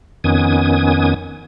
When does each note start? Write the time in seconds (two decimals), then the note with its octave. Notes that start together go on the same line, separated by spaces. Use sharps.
0.24 F2 D#3 B3 C#4 G#5 D#6